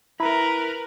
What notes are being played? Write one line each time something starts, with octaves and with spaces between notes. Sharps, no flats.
E4 A#4 B4 A#5 B5